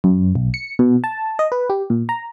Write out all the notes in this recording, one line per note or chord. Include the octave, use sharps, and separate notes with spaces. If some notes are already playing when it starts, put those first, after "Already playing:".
F#2
B1
C#7
B2
A5
D#5
B4
G4
A#2
A#5